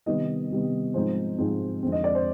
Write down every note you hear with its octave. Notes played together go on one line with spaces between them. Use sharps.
C3 D#3 G3 B3 D#5
C3 D#3 G3 B3
G#2 F3 G#3 C4 D#4 C5
G#2 F3 G#3 C4 D#4
F2 D3 G#3 C4
D#5
D5
C5